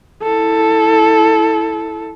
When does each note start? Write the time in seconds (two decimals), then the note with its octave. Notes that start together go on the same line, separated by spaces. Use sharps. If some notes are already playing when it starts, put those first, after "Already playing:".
0.23 E4 A4